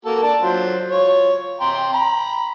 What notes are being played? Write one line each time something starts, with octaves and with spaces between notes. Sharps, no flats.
A#3 F#4 A4
D4 A5
F#3 F4 C5
F4 C#5
G5 A#5 C6
A#5 B5